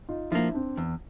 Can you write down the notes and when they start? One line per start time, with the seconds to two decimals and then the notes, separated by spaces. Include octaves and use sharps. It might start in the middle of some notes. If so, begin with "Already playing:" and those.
0.09 D#4 F4
0.31 F3 A#3 D4 E4
0.54 C4 D4
0.77 E2